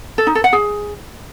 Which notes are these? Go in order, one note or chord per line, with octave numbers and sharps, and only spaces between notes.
A4
D#4
A4
F#5
G#4